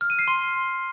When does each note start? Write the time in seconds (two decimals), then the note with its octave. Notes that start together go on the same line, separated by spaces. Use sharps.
0.01 F6
0.10 D#7
0.19 C7
0.28 C6